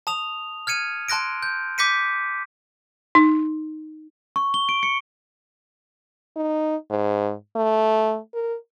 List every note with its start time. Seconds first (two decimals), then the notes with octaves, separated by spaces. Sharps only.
0.07 A5 D#6 F7
0.67 F6 G#6 C#7 D#7
1.08 A5 C6 F#6 A#6 D7
1.43 G6
1.78 D6 G6 A#6 B6 C#7 D#7
3.15 D#4
4.36 C#6
4.54 G7
4.69 D7
4.83 C#7
6.36 D#4
6.91 G#2
7.56 A3
8.34 A#4